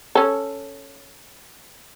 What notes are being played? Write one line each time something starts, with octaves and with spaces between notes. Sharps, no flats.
C#4 A4